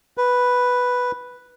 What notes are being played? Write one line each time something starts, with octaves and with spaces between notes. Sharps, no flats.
B4